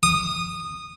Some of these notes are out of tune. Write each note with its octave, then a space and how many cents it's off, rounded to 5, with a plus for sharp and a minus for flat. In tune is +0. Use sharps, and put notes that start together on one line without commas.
D#6 -15